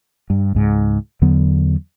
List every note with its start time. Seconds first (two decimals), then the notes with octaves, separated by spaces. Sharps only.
0.30 G2
0.55 C#2 G#2
1.22 E2 D3 F#3 B3